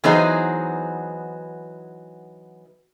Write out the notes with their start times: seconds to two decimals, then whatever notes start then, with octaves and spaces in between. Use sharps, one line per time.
0.04 E3 F#3 B3 D#4 G#4 C5